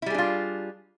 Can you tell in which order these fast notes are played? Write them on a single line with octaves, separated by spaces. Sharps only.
E4 G3 G#4 D4 F4